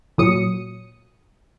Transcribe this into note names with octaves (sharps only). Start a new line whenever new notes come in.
A#2 F#3 D#6 C#7